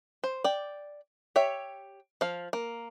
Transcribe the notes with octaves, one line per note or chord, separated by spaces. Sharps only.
C5
D5 G5
G4 C#5 E5
F3 F5
A#3